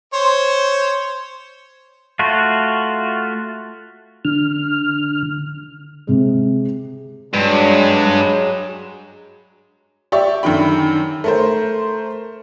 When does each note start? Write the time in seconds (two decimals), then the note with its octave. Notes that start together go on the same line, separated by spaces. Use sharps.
0.14 C5 C#5 C6
2.19 A3 F4 F#4
4.25 D3 F6
6.07 C3 G#3
7.33 G2 F#3 G#3
10.12 G4 D5 E5 C#6
10.43 F#2 D3 D#3 G5 B5
11.24 A3 A#4 C5